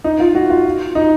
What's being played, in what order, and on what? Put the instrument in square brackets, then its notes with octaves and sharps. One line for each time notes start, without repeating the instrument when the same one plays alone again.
[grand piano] D#4
F4
F#4
F4
D#4